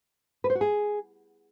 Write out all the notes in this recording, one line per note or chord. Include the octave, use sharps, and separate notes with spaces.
B4
C5
F#4
G#4